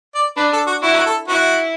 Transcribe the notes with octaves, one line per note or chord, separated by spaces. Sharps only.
D5
D4 B4
A4
F#4
E4 F#4
F#4
A4
E4 F#4